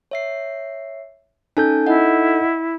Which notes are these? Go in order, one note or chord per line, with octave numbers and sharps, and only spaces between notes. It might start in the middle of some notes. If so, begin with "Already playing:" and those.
C#5 E5 C7
C#4 D#4 A4 G#5 A5 G6
E4 D#5 F#5